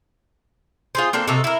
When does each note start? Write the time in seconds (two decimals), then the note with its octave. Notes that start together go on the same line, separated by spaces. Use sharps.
0.95 F4 G#4 C5
1.13 A#3 C4 D4 A4
1.28 C3 D#4 F#4 A4
1.44 E4 A#4